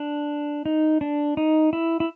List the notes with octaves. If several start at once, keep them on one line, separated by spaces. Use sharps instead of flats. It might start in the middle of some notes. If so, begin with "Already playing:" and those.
Already playing: D4
D#4
D4
D#4
E4
E4